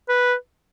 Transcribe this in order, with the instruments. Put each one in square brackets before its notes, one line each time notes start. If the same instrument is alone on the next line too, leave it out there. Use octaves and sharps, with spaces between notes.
[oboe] B4